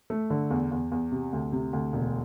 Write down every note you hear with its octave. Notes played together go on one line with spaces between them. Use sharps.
A3
D3
E2
E2
E2
C3
D2
C3
D2
E1